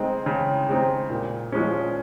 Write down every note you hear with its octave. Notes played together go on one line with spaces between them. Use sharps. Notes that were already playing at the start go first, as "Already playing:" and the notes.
Already playing: C#3 G#3 C4 D#4
C#3
G#3 C4 D#4
A#2
F3 G#3 C#4